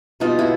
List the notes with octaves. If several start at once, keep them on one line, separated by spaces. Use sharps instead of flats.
B2 G3 B3 D#4 F4
E4 F#4